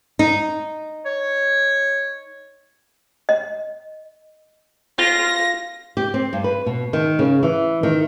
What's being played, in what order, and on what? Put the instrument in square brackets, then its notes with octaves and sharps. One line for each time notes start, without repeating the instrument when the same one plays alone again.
[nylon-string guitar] D#4
[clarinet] C#5
[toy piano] D#5
[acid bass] F4 [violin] A#6
[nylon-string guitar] G4
C4
G2
B4
B2
D#3
C#3
E3
D#3